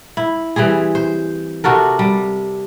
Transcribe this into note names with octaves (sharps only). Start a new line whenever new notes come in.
E4
E3 G3 C4 G#4
C5
C3 F#4 A4 A#4
G3